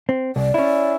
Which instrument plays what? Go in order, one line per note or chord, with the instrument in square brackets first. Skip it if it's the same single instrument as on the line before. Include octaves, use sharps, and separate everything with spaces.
[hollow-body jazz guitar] C4
[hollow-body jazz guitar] C2 [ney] D5
[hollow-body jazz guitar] C#4 E4